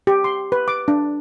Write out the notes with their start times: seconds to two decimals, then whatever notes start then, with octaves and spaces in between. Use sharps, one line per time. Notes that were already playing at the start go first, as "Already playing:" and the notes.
0.07 G4
0.24 C6
0.52 B4
0.68 D6
0.88 D4